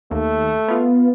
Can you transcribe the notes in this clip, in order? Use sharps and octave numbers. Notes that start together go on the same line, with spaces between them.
D#2 A3
B3 F4